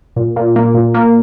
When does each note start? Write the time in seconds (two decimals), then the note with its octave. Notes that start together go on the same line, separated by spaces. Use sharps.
0.16 A#2
0.36 A#2
0.56 A#3
0.74 A#2
0.94 A#3